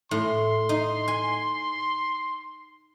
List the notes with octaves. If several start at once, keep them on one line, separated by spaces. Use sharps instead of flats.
A2 C6
D#4
G#5